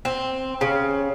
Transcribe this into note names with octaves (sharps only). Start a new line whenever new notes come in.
C4
C#3